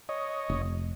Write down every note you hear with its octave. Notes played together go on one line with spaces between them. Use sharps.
C#5 D#5
F1